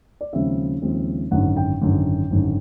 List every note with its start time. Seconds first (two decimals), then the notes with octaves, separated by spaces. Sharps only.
0.21 D5
0.33 D#2 C#3 F3 G#3 C4 E5
0.82 D#2 C#3 F3 G#3 C4
1.31 G#1 F#2 D3 F#5
1.57 G5
1.81 G#1 F#2 D3
2.30 G#1 F#2 D3